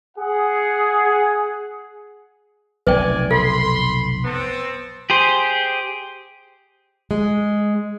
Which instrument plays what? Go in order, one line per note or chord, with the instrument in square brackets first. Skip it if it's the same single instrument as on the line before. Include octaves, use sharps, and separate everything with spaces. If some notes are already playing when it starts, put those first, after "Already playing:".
[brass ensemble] G#4 F#5
[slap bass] F1 B1 [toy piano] B4 G5 [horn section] D5 G#5
[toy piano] A4 [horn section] B5 C6
[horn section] B3 C4 A5
[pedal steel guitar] G4 G#4 C5
[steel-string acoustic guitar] G#3